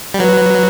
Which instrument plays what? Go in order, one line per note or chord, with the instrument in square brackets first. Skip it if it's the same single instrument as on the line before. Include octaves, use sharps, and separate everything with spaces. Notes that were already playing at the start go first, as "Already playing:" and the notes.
[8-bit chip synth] G3
[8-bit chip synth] F#3 [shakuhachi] B4